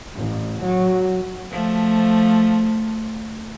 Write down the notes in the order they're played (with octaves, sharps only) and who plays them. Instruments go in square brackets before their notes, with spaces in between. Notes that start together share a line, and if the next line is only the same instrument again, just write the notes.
[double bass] A1
F#3
[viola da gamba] F3 A3